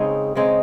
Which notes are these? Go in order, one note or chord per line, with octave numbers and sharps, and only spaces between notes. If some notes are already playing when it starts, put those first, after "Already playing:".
Already playing: C#3 G#3 C4 D#4
C#3 G#3 C4 D#4